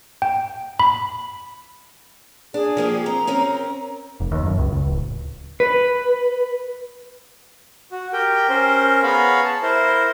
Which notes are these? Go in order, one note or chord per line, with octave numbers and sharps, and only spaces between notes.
G5
B5
D4 G#4
F3 A#3 G4
C4 A#5
C4 C#4 A#4
F1
D#2
F#2
C#2
C#2
D1
B4
F#4
G4 A#4 G5
C#4 A#4 C5
B3 G#4 C#5 F5 A#5 B5
A5
E4 A#4 C5